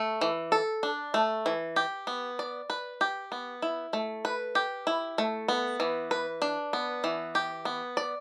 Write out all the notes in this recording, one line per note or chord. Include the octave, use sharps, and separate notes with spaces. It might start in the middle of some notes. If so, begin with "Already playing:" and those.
Already playing: A3
E3
A4
D4
A3
E3
G4
B3
D5
B4
G4
B3
E4
A3
B4
G4
E4
A3
B3
E3
B4
D4
B3
E3
G4
B3
D5